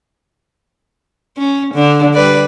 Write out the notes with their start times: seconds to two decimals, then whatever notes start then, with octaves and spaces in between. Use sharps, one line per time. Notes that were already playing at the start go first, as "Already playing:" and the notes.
1.38 C#4
1.74 D3
2.14 G3 B4 D5